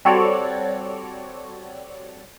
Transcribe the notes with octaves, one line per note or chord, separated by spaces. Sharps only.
G3 C4 F#4 A4 C#5 D5